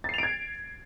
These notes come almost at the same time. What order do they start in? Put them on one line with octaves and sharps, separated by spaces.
A6 C7 F7 D7 G#6